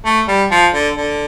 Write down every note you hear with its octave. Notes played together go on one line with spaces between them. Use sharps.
A3
G3
F3
D3
D3